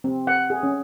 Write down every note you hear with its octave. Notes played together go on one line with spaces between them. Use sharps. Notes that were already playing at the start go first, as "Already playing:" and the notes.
C4
F#5
G#4
C#4